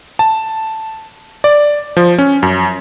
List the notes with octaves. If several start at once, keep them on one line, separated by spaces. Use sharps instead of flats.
A5
D5
F3
C#4
F#2